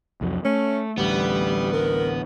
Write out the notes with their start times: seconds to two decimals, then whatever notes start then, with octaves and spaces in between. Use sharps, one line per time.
0.21 C2 F2 F#3
0.45 A3 C#4
0.98 A1 D2 G3 B3
1.73 A#4